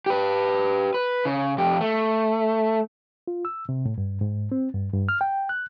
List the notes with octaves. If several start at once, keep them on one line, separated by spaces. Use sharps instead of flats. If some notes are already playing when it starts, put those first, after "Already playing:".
G4 B4
B4
C#3
F2 G4
A3
F4
E6
C3
A2
G2
G#2
C4
G2
G2
F6
G5
F#6